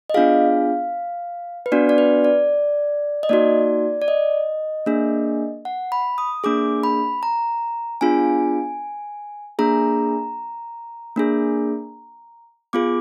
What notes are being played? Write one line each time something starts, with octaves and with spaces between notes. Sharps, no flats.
D#5
B3 D4 F4 G#4 F5
B4
B3 D4 F#4 D5
D5
B4
D5
D#5
A#3 D#4 F#4 D5
D5
D#5
A#3 D4 G#4
F#5
B5
D#6
A#3 D4 G#4 D6
B5
A#5
B3 D4 F4 G#4 G#5
A#3 D4 G#4 A#5
A#3 D4 G#4
B3 F4 G#4 D6